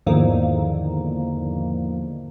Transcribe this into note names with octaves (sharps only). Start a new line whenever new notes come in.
E2 G#2 D3 D#3 F3 A#3